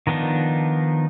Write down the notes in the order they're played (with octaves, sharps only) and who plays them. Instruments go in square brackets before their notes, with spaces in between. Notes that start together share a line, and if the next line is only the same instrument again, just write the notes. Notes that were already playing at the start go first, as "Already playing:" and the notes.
[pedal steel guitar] D#3 F3 B3 D4 D#4